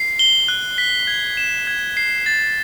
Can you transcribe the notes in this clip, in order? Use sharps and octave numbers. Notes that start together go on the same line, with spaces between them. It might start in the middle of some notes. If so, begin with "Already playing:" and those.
Already playing: C7
G7
F#6
B6
G#6
E7
G#6
C7
A6